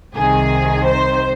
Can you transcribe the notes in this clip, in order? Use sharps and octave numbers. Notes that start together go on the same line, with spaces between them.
C2 C3 D#3 G#4
C5